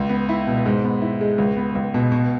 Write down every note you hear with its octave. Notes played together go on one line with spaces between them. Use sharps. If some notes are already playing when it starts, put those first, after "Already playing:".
Already playing: C#2
B3
E4
B2
G#2
B3
E4
G#3
C#2
B3
C#2
B2
B2